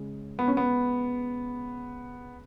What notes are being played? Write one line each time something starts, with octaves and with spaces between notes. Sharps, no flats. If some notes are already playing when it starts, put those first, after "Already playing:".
Already playing: C#3 G#3
B3
C#4
B3